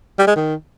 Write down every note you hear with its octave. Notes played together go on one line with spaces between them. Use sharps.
G3
G#3
D#3